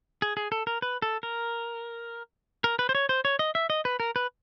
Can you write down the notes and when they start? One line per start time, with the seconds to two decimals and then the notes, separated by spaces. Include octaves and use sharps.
0.22 G#4
0.37 G#4
0.52 A4
0.67 A#4
0.82 B4
1.02 A4
1.23 A#4
2.64 A#4
2.79 B4
2.89 C5
2.95 C#5
3.09 C5
3.25 C#5
3.39 D#5
3.55 E5
3.70 D#5
3.85 B4
4.00 A#4
4.16 B4